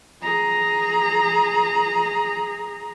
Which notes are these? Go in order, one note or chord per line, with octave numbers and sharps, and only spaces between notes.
G#4 A#5